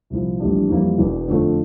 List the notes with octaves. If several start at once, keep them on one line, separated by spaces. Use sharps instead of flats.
C2 A#2 F3 A#3 E4
A#1 A2 E3 G3 D4
F2 E3 G3 A#3 E4
E1 E2 E3
F2 D3 F3 A3